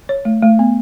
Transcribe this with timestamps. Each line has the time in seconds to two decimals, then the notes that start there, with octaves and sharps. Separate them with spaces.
0.09 C#5
0.25 A3
0.43 A3
0.59 B3